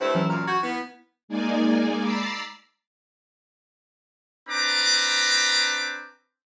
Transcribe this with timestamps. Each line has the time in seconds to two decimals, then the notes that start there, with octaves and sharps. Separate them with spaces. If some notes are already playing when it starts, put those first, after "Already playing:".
0.01 G2 A3 E4 C5
0.15 E3 F#3 C#4
0.30 F#2 A#2 A#5 F6
0.47 F#4 G6 G#6
0.63 B3 E4
1.28 G#3 A#3 D#4 D5 G#5
2.02 A#5 B5 D6 E6 A6 C7
4.49 C4 D4 B4 A#5 D6